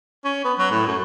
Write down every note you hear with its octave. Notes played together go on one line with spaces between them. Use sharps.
C#4
B3
F#3
A2
F#2